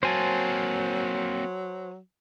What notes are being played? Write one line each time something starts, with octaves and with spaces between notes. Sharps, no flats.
F#3 A#3 C4 C5 G#5 A5